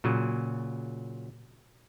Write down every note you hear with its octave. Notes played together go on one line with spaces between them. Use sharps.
A#2 C#3 F#3